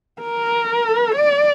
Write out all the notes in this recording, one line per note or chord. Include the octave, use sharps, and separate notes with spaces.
A#4
D5